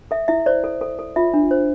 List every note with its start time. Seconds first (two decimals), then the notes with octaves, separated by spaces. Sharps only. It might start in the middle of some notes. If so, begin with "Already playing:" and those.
0.11 A4 E5
0.28 E4 E5
0.46 C5 D5
0.64 A4
0.81 A4
0.99 A4
1.16 F4 E5
1.34 D4
1.51 C5